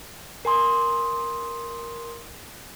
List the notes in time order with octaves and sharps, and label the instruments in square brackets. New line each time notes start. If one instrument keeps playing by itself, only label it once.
[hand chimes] A#4 G#5 C6 D#6